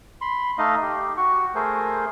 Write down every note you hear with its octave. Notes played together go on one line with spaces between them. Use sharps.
B5 C6
A3 D#4 D#5 F5
G4
F#4 C#6
A3 G#4 A#4 C5